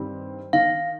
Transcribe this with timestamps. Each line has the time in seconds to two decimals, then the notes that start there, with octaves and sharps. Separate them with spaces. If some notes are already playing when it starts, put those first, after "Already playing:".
Already playing: G2 D#3 G3 C4
0.53 D#3 F5